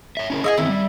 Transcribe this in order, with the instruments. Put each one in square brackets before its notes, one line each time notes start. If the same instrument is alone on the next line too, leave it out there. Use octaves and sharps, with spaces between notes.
[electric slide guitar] C#5 E5
C#4 E4 A#4
[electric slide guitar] G#4 [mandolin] D#5 E5 G#5
[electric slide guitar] D#3 E3 C4 [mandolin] E4
[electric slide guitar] G3